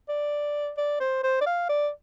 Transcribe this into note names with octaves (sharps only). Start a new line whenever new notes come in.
D5
D5
C5
C5
D5
F5
D5